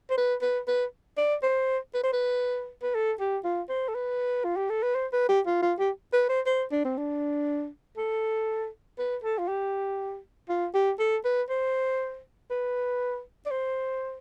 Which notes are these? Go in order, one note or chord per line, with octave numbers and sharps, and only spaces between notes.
C5
B4
B4
B4
D5
C5
B4
C5
B4
B4
A4
G4
F4
C5
A4
B4
F4
G4
A4
B4
C5
B4
G4
F4
F4
G4
B4
C5
C5
D4
C4
D4
A4
B4
A4
F4
G4
F4
G4
A4
B4
C5
B4
D5
C5